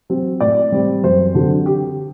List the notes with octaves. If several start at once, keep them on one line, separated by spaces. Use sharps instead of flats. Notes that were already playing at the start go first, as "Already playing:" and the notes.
F#3 C4
A2 D5
G3 C4
F#2 C5
D3 F#3 C4
G4